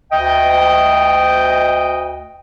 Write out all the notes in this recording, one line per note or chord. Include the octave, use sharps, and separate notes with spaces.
D2 D#5 G5